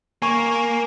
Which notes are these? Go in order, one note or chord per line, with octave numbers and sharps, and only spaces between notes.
A#3 G#5 C#6